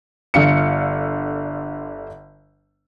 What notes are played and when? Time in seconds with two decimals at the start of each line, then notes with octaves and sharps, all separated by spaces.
0.34 G1 D3 F5 C#7